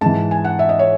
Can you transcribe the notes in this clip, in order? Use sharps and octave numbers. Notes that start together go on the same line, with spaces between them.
G#2 E3 A5
G#5
F#5
E5
D#5
C#5